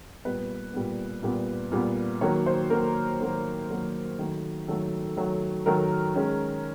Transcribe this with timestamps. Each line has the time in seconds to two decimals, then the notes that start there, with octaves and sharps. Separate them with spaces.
0.25 A#2 G3 B3 B4
0.73 A#2 G3 B3
1.23 A#2 G3 B3
1.72 A#2 G3 B3
2.21 D#3 F#3 A#3 C#5
2.46 C5
2.70 D#3 F#3 A#3 A#4
3.20 D#3 F#3 A#3
3.70 D#3 F#3 A#3
4.19 D#3 F#3 A3
4.68 D#3 F#3 A3 A4
5.17 D#3 F#3 A3
5.66 D#3 F#3 A3 A#4
6.15 D#3 G#3 C#4